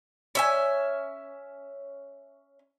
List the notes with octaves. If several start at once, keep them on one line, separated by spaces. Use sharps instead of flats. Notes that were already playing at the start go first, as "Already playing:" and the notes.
C#4 E5 G#5